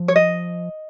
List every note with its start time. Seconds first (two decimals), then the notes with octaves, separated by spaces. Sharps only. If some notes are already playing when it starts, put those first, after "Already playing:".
Already playing: F3
0.08 C#5
0.16 D#5